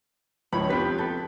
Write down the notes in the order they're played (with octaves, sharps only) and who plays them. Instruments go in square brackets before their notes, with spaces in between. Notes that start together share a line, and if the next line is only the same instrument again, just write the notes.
[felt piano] C#2 [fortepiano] F3 C#5 [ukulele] B5
[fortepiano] F2 B4 [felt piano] B3 B6 [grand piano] G4 G6
[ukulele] A4 [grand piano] G6